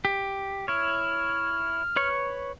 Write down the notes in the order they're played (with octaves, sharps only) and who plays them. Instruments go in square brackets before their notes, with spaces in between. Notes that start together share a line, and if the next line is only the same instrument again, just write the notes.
[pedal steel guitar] G4
[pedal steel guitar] E4 C#5 [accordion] F6
[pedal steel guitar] B4 C#5 C#6